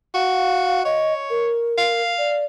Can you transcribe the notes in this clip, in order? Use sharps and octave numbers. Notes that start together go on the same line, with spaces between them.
F#4 F5
C#5 D#5
A#4
F5
D5